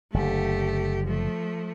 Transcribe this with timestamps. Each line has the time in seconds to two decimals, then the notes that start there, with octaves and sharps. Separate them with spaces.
0.14 F#1 D3 A3 G4
1.05 F3 A3